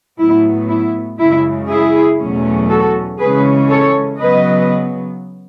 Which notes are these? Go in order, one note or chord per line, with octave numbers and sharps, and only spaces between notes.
A2 F#3 B3 E4
E4
F#2 C#3 G#3 E4
E4 G#4
E2 B2 F#3 A3 C#4
F#4 A4
C#3 E3 G#3 C#4 G#4 B4
A4 C#5
C#3 F#3 B3 B4 D#5